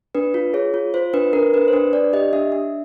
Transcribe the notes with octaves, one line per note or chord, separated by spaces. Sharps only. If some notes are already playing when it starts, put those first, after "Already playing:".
D4 B4
F4
G#4 C#5
F4
F4 C5
D4 B4
D4 A#4
D4 B4
C5
D4 B4
D4 D5
G4 D#5
D4 E5
D4